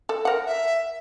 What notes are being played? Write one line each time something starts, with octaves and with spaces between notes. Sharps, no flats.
A4
A#4 F#5
E5